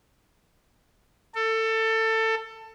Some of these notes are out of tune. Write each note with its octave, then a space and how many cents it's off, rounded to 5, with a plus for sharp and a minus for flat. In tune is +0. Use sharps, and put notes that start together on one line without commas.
A4 +20